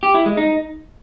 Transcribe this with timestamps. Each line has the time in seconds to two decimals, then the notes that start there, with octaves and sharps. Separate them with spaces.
0.03 G4
0.14 E4
0.26 G#3
0.37 D#4